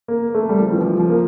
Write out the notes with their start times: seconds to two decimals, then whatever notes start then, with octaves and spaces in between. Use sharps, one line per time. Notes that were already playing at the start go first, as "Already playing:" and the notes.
0.08 A#3
0.30 A#3
0.35 A3
0.49 G3
0.60 F3
0.73 E3
0.80 F3
0.99 F3
1.10 A#3